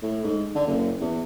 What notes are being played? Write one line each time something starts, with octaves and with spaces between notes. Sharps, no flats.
A2
G#2
D3
F#1
E2